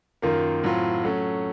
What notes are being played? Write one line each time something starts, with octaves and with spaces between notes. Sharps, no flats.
F#2 D#3 A#3 F4
A2 F#3 C4 F4
F#3 A3 C#4